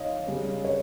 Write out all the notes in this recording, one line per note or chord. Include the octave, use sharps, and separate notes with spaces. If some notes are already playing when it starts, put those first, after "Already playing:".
Already playing: D#3 F4 C#5 D#5
C#3 G3 C#4
C#5